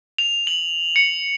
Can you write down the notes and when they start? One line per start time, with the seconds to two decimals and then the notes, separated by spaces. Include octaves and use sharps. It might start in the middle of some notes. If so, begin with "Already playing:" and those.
0.18 F7
0.47 F#7
0.96 C#7